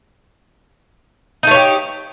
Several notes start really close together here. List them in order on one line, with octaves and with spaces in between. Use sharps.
D#4 A3 C#5 G4